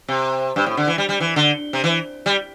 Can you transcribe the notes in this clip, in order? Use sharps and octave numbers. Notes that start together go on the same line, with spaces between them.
C3
G2
A2
D3
E3
G3
G3
E3
D3
C3
E3
G3